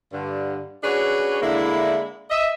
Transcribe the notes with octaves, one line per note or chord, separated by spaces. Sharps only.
G2 D3
C#4 D4 F#4 G#4 B4 C#5
D3 G#3 A#3 D4 E4
D#5 E5